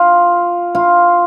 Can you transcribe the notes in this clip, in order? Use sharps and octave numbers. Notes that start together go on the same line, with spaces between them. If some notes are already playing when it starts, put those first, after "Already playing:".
Already playing: F4
F4